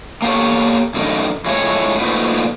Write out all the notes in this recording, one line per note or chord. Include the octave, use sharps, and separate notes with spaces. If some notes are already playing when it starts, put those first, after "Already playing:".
A#3 B3 G4 A4 C#5
F#2 D3 D#3 A3 D#4
F2 G#3 A3 E4 F4 C#5
A#2 F3 A3 D#4 F#4 B4